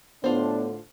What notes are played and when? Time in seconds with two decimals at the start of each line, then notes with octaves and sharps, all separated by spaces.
0.24 A2 D3 B3 D4 F4 C5